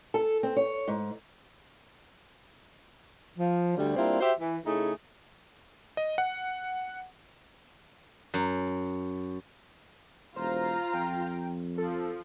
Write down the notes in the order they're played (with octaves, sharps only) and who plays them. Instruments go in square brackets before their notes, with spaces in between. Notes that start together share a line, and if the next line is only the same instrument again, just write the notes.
[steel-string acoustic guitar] A4
C4
C#5
G#2
[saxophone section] F3
D2 D3 G3
G3 A#3 C4 D4 E4 F4
F#4 G4 C5 E5
E3
C#3 A3 D#4 E4 G#4
[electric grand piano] D#5
F#5
[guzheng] F#2
[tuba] E1 [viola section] F4 F5 A#5 [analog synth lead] C5
[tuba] F2 [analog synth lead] G5
[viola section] F3 [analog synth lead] A4